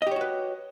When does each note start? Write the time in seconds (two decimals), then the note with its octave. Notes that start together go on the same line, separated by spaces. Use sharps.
0.02 D#5
0.07 G4
0.11 C#5
0.16 F#4
0.21 B4